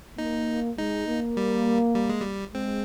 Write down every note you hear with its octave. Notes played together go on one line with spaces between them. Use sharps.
A#3 D#4
G#3 D#4
A#3
G3
G3
G#3
G3
G#3 C4